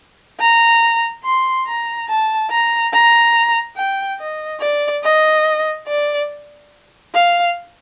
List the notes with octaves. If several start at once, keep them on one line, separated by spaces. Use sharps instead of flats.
A#5
C6
A#5
A5
A#5
A#5
G5
D#5
D5
D#5
D5
F5